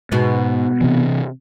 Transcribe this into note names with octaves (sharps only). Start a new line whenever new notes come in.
G#2 B2 B3 F#4
C3 E3